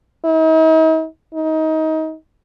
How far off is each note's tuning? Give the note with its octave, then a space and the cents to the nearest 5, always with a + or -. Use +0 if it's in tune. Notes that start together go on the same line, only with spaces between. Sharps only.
D#4 +45
D#4 +25